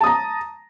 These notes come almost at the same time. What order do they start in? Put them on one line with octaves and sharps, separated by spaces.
A5 D#6 A#5